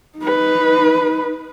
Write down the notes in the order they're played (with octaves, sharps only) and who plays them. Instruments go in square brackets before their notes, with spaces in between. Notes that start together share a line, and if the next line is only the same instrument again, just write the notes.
[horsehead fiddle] D#4 B4